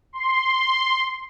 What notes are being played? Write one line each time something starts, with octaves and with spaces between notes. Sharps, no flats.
C6